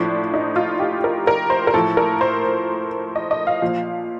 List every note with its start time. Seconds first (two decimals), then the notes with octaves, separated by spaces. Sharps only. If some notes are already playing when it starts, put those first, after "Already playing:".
Already playing: A2 F3 D4
0.34 D#4
0.56 F4
0.80 G4
1.04 A#4
1.27 A#4
1.50 C5
1.67 A#4
1.74 A2 F3 A4
1.97 A#4
2.21 C5
3.16 D#5
3.31 D#5
3.47 F5
3.62 A#2 F3